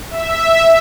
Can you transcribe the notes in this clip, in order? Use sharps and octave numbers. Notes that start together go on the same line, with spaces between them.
E5